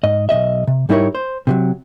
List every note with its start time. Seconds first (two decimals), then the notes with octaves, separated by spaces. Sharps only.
0.03 G#2 D#5
0.29 B1 F#2 D#5 E5
0.67 C3
0.89 G#2 G3 D#4 E4 A#4 C#5
1.15 C5
1.47 C3 E3 F#3